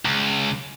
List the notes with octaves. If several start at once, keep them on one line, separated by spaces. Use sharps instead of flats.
C#2